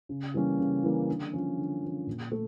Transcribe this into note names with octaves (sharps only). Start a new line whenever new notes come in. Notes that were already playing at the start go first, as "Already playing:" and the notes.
C#3
E3 G3 A#3 C#4
C#3
E3 G3 A#3 C#4
D3
F3 C#4
D3
F3 C#4
A#2
A3